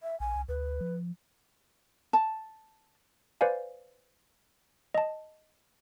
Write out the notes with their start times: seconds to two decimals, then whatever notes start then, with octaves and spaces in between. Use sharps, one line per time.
0.03 E5
0.20 A#1 G#5
0.35 C2
0.49 D2 B4
0.81 F3
2.13 A5
3.41 B4 C5 D5 F5 G#5
4.95 D#5 A5